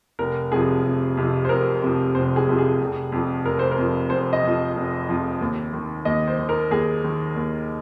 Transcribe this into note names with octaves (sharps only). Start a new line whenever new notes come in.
F1 A#4
F2 C3 F3 G#4
F1
F2 C3 F3
C5
F1 A#4
F2 C3 F3
F1 C5
G#4
F2 C3 F3
G#4
F1
F2 F3
F1 A#4
C5
A#4
F2 F3
F1 C5
D#5
F2 F3
F1
F2 F3
D#2
D#3
D#2 D#5
C5
D#3
A#4
D#2 G#4
D#3
D#2